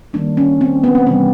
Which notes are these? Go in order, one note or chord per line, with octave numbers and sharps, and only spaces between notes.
D#3 G3 A#3 D4
C#4
C4
B3
C4
C3 E3 G3 B3